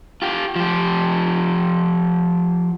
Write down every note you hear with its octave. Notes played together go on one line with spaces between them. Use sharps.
F4 G4
F3 G4